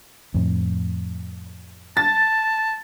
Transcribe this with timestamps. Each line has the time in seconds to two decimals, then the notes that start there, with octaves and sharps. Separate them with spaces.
0.34 F2 A2
1.97 A5 A6